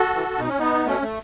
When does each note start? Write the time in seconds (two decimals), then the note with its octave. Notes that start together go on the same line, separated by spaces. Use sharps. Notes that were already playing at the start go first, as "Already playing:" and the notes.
Already playing: F#4 A4
0.15 E3
0.38 B2 D#4
0.48 C#4
0.59 B3 D#4
0.86 B2 A3 C#4
1.02 A3